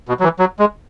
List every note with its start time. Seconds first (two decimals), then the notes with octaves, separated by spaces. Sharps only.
0.08 B2
0.20 F#3
0.24 E3
0.39 F#3
0.59 G#3